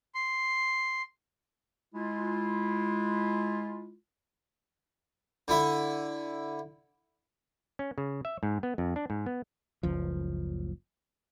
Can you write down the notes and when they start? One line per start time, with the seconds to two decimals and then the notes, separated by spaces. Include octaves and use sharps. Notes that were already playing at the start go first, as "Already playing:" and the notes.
0.15 C6
1.95 G#3 E4 F4
5.48 D3 E4 E5
7.79 C#4
7.98 C#3
8.25 E5
8.43 G#2
8.63 B3
8.78 F2
8.96 D4
9.10 G#2
9.26 B3
9.83 F#1 C#2 F3